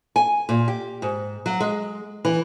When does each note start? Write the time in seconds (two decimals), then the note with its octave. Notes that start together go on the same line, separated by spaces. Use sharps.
0.16 G#5
0.49 A#2
0.68 G4
1.02 G#2
1.46 F#3
1.60 G#3
2.25 E3